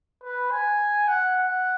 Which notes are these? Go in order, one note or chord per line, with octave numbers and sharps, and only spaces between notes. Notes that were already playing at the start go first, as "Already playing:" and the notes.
B4
G#5
F#5
F#5